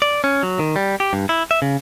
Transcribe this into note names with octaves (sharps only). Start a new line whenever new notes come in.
D5
C#4
F#3
D#3
G3
G4
G2
E4
E5
C#3